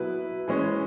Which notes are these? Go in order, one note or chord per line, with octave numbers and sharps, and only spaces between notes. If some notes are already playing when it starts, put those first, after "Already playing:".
Already playing: B2 F#3 B3 E4 B4
E3 G#3 C#4